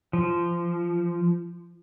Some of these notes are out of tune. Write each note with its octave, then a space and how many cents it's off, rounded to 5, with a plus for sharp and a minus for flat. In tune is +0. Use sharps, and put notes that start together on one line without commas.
F3 -20